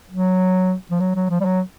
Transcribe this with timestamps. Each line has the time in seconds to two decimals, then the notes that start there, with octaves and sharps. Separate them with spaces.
0.10 F#3
0.91 F3
1.00 F#3
1.15 F#3
1.30 F3
1.40 G3
1.45 F#3